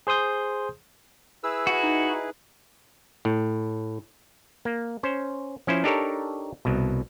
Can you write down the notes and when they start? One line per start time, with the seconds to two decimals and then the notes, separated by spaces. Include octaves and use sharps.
0.07 G#4 C5 C6 D#6 G6
1.44 E4 G#4 B4 E6
1.67 F#4
1.83 D#4
3.25 A2
4.65 A#3
5.03 C#4 C5
5.67 F3 C#4 E4 C5
5.84 D4 D#4 G4 A4 A#4 C#5
6.65 C2 B2